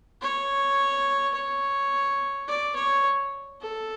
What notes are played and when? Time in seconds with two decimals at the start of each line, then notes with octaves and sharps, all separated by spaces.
0.22 C#5
1.34 C#5
2.48 D5
2.76 C#5
3.61 A4